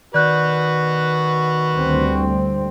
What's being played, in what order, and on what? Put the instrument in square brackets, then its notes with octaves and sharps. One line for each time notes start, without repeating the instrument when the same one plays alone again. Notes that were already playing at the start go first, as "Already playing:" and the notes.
[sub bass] D#3 [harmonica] F#4 B4 [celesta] D5 F#6 G6
[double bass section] D2 G3 C4